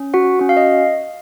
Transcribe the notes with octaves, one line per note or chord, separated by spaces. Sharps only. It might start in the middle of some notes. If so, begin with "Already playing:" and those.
Already playing: C#4
F#4 F#5
C#4 F#4
F5
D#5